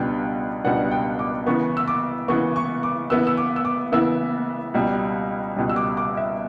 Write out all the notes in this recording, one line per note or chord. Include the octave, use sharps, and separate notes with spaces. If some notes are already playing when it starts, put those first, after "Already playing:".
Already playing: C#2 B2 G3 B3 D4 G5
C#2 B2 G3 B3 D4 F#5
G5
D6
C#3 E3 B3 C#6
E6
D6
C#3 E3 B3 C#6
C#6
D6
C#3 E3 B3 E4 E6
E6
D6
E6
D6
C#3 E3 B3 E4 E6
C#2 B2 G3
C#2 B2 G3
E6
D6
D6
E5